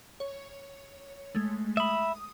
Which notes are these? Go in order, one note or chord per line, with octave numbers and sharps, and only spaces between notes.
C#5
G#3 A3
E5 B5 D#6